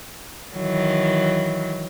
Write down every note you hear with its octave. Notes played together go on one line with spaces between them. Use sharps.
D#3 E3 F#3